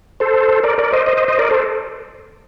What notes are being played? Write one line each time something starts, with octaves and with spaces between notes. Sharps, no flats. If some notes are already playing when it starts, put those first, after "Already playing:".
A4 C5
A#4 D5
A#4 D5
C5 D#5
C5 D#5
C5 D#5
C5 D#5
A#4 D5
A4 C5